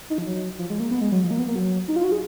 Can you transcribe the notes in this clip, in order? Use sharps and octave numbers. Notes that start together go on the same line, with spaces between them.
D#4
F3
F#3
F3
G#3
A#3
B3
G#3
F#3
F3
A#3
B3
A#3
F#3
D#4
F4
F#4
G#4